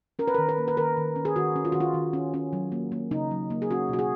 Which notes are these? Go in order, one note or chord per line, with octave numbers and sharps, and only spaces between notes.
C#4 A#4
B4
D#3 A#4
B4
A#3
B4
D#3 A#4
D#3
C#4
G#4
D#3 F#4
C#4
F4
D#3 F#4
F4
D#3
C#4
C#4
F#3
A#3
A#3
C#3 D#4
F#3
A#3
G#4
C#4 F#4
B2 F#4
G#4